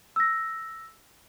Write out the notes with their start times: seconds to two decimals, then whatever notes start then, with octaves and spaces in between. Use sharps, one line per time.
0.16 E6 A#6